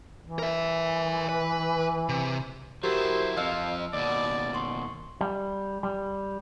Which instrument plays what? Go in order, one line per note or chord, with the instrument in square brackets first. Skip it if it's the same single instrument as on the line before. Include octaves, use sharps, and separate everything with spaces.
[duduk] E3
[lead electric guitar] A#4 E5
B4
C3
[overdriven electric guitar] F#3 E4 [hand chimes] F#4 G4 A#4 [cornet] C5
[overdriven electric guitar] F2 F3 [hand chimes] D#5 E6 [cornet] F5
[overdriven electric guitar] D#2 B2 [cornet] D5
[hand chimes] C6 C#6
[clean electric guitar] G3
G3